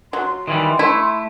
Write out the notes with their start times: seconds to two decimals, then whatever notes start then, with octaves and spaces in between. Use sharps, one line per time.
0.13 F#3 C6
0.48 D#3 E3 G3
0.79 A3 E4